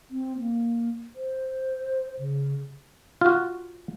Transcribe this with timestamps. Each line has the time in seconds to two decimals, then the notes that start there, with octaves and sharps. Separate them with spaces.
0.10 C4
0.39 A#3
1.15 C5
2.19 C#3
3.21 F4 F#4